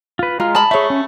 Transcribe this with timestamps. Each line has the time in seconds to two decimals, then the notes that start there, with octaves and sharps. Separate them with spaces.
0.19 F4 B4
0.40 G#3 F4 A#5 F6
0.55 D#5 A5 B5
0.71 A3 G#4 C#5 E5
0.90 C#4